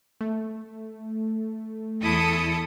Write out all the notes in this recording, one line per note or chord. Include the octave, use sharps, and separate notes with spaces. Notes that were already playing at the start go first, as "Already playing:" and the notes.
A3
E2 E4 A4 D#6 C#7